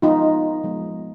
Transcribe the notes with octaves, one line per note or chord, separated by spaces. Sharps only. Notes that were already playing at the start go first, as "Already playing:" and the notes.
F3 G#3 B3 D#4 F4
F3 G#3 B3